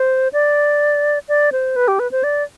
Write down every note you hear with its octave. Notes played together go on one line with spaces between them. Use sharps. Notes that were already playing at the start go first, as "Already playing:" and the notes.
Already playing: C5
D5
D5
C5
B4
G4
B4
C5
D5